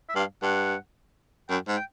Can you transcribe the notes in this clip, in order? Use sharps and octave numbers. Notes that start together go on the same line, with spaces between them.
E5
G2 F5
G2 F#5
F#2 G5
G#2
G5